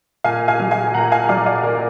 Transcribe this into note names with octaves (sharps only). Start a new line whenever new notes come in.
A#2 F5 G#5
F5 G#5
F#3
F5 G#5
A#2 F#5 A#5
F5 G#5
F#3 D5 F5
D5 F5
A#2 A#4 D5